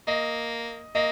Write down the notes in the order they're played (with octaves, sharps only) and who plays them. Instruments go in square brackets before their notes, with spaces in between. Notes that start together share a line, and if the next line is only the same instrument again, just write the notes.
[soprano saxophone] A#3 [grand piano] D#5
[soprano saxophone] A#3 [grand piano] D#5